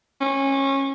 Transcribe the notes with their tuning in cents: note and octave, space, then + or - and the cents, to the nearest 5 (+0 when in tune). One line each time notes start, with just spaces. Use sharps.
C#4 -20